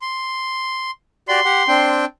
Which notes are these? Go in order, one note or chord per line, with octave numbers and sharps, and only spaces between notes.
C6
F#4 G4 D5 C6
G4 F#5
C4 D4 G5